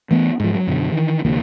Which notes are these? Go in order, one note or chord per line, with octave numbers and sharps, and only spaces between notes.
E3 A3 B3
G#2 F3
F#3
F#2 B2 D3 F#3
D#3 E3
D2 C3 E3 A#3